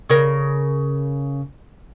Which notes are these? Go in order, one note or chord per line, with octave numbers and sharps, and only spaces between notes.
C#3 A#4